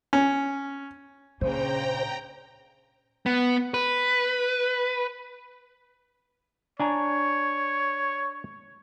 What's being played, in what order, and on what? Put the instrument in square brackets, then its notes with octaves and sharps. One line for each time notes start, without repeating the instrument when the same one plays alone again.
[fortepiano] C#4
[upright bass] A#2 [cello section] C#3 C#4 D4 [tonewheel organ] C5 [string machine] G5 A#5
[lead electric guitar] B3
B4
[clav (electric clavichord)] D4 G#5 A#5 [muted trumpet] C#5